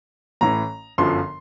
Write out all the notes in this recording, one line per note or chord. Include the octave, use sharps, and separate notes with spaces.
A1 A2 E3 A#5
G1 F#2 D3 F3 C6